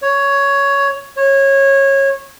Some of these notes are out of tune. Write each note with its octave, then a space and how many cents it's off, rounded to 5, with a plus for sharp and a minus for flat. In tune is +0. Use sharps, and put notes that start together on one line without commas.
C#5 +10
C#5 -20